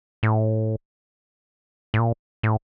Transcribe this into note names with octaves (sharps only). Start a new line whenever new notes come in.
A2
A2
A#2
A2